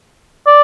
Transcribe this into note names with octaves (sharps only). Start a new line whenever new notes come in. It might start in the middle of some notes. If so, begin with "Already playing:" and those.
D5